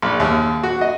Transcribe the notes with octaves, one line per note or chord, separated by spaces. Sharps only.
A#1
D#2
F#4
D#5